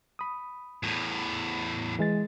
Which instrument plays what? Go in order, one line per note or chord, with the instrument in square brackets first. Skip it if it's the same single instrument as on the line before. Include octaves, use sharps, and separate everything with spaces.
[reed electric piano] B5 D#6
[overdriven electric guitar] E2 A2
[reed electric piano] E3 G#3 A6